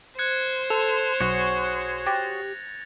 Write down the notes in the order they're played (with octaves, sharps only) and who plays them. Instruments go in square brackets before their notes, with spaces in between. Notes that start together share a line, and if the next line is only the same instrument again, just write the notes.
[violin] C5 [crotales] F#6 G#6 C#7
[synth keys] A4 [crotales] F7
[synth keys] B1 [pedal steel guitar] F#4 G#4 C#5
[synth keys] G4 [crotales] A6 A#6